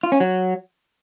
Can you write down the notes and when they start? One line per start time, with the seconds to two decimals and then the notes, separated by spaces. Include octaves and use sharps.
0.03 F4
0.12 C#4
0.20 F#3